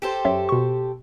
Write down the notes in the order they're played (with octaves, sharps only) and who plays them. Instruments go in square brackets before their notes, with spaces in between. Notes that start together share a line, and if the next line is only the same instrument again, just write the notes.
[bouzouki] G4 A4 C5
[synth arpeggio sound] F#2 C#5 E5
B2 C#6